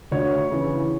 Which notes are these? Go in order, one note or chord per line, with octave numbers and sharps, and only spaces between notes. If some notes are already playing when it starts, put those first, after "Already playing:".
D2 C#5
C#3 E3